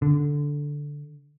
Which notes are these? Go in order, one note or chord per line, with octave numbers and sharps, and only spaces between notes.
D3